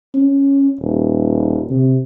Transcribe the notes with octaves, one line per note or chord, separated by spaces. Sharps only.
C#4
D#1
C3